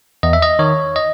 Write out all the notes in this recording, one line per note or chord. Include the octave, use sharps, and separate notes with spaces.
E2 D#5
E5
D#5
D#3 C#5
D#5